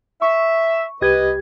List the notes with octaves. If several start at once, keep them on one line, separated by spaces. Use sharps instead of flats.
E5 C#6
C2 G4 B4 D#5 G#6